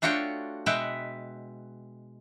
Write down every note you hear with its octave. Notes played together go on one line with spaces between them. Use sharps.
A3 D4 F4 F#4 C#5 G5
B2 G#3 B4 E5 F#5 G5